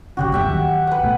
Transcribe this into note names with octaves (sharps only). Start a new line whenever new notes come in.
A#1 C#3 C#4 F#4 G4 F#5
A1 E2 G2 G4 E5 F#5
D#2 F#3
B4 F#5
C2 B2 A3